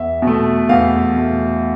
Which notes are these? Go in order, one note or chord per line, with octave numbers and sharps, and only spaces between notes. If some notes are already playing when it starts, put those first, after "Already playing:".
Already playing: E2 E5
B2
A3
E2 F5
B2 A3